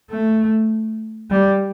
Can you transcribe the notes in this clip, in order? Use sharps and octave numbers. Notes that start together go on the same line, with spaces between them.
A3
G3